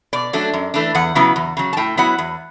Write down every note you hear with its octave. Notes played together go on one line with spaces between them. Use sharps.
B2 D5
F#3 A3 D4
F#2
E3 A3 D4
E2 F#5
C#3 F#3 B3 E4
E2
C#3 F#3
A5
A2 G5
F#3 B3 E4 F#5
E2